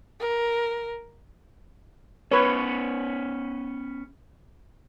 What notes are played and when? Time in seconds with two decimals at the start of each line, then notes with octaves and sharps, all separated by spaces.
0.21 A#4
2.31 B3 C#4 B4 C#5